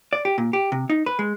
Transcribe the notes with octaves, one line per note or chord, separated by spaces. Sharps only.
D5
G4
A#2
G4
C3
D#4
B4
G#3